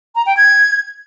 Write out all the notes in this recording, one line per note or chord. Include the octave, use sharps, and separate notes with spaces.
A#5
G5
G#6